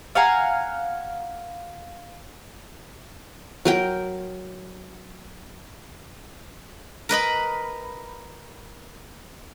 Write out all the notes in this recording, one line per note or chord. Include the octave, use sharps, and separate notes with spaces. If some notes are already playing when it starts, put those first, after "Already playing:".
F5 F#5 G#5 A#5
F#3 A#4 G5
A#4 B4 D#5 B5